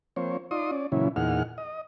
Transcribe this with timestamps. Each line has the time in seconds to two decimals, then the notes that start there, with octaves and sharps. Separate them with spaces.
0.16 F3 A#3 C4 C5 C#5
0.51 D#4 F4 D5 C6 D#6
0.71 C#4 D5
0.92 A#2 C#3 E3 F#3 C#4 E4
1.16 E2 A#2 D#4 G#4 F#5 F6
1.58 D#5